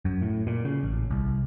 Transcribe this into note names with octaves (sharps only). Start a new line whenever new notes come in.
F#2
A2
A#2
C#3
A1
C2